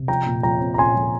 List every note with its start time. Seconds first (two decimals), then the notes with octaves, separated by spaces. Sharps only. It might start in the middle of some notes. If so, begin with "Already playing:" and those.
Already playing: C3
0.08 F3 G5 A#5
0.26 A#2
0.43 F3 G5 A#5
0.60 C4
0.74 A#5
0.78 A#2 G#5 C6
0.95 F3